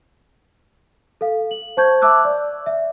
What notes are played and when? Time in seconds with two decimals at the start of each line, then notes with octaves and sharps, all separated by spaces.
1.21 A4 F5
1.51 F#7
1.77 C5 A5 C#6 G6 G#6
2.02 E5 A5 D6 E6 F#6
2.25 D5
2.66 E5